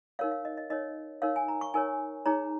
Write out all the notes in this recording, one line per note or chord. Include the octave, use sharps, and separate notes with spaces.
D#4 A#4 C#5 F5
F5
D#5
D#5
D#4 A#4 C#5 D#5
D#4 A#4 C#5 F5
G#5
A#5
C#6
D#4 A#4 C#5 G#5
D#4 G#4 C#5 A#5